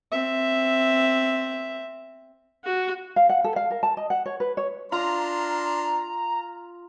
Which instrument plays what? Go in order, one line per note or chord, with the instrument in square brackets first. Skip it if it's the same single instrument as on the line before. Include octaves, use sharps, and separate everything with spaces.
[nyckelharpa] C4 E5
[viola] F#4
[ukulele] F5
F#5
A4
F5
A#4
A5
D#5
F#5
C#5
B4
C#5
[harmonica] D4 C6 [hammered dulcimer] F4 [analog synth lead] A#5